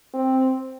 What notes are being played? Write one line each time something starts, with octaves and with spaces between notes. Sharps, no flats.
C4